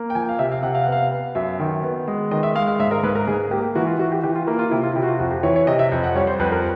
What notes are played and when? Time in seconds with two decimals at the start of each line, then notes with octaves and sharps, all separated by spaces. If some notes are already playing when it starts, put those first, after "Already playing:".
Already playing: A#3
0.10 G5
0.15 F3 G#5
0.29 F5
0.39 C3 E5
0.52 F5
0.63 C3 F#5
0.75 F5
0.84 B3 F#5
0.92 F5
1.11 B3
1.35 F#2 E5
1.59 D#3
1.83 B3
2.08 G#3
2.31 D#3 D#5
2.43 E5
2.55 G#3 F5
2.67 F5
2.79 G#2 E5
2.91 A#4
3.03 G#2 B4
3.15 A#4
3.27 G#2 G#4
3.51 A#3 G4
3.75 E3 F#4
3.87 F4
3.99 E3 F#4
4.12 G4
4.23 E3 G4
4.35 F4
4.47 A#3 E4
4.59 F4
4.71 C3 E4
4.83 F4
4.96 C3 E4
5.02 F#4
5.08 F4
5.19 F2 F#4
5.31 G4
5.43 E3 C#5
5.56 C#5
5.67 C3 D#5
5.79 E5
5.92 F2
6.04 F#5
6.15 G3 C#5
6.27 C5
6.39 F2 B4
6.52 A#4